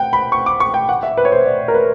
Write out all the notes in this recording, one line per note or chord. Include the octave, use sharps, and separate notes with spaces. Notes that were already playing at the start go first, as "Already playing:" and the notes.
Already playing: F#5 G5
B5
C#6
D6
C#6
G5
F#5
E5
B4
C#5
C5
D5
A#4
B4